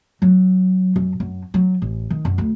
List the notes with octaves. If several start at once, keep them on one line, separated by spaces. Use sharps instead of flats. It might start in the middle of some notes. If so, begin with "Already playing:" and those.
F#3
F#2
F#2
F#3
A1
D#3
F#2
D2